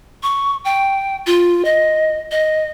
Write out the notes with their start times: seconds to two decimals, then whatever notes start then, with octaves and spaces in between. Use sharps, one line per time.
0.23 C#6
0.65 G5
1.27 F4
1.65 D#5
2.31 D#5